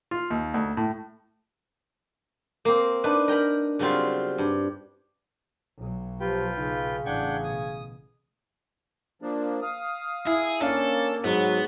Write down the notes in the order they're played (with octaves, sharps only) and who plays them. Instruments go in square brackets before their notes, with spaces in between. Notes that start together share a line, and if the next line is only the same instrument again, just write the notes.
[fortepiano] F4
D#2
D2
A2
[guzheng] A#3 C4
D4 D#4 B4
A#4 G5 A#5 B5
C#3 F#3 G3 C4 F4
G2
[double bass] B1 F#3
[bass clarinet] F3 [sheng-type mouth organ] F4 B4 G5 [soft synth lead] G4
[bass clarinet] C#3 [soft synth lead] D#4
[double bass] A1 [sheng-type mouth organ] D4 F#5 G5 [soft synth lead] G#6
[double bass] B2 [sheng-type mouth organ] D#6
[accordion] F3 A#3 D4
F5 D#6
[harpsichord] E4 [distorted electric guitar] G#4
[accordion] A#3 [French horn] C#4 [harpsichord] D4 F5 [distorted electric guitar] A4
[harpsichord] G#2 [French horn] F#3 [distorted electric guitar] B3